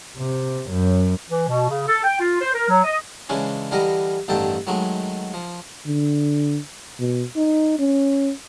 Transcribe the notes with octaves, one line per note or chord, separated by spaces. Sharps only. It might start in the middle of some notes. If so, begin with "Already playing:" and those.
C3
F#2
E3
B2
C#3
A4
G5
F4
C5
A#4
F#3
D#5
C#3 E3 G#3 C#4 D4
D3 E3 G3 A#4 D#5
A1 G2 D3 D#3 A4 G5
D#3 F#3 G#3 A3
F3
D3
B2
D#4
C#4